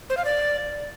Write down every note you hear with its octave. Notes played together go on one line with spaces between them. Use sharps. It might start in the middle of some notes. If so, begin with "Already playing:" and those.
C5
F5
D5